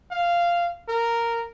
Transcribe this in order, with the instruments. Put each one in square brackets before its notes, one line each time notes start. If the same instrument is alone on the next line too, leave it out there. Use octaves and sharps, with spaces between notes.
[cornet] F5
A#4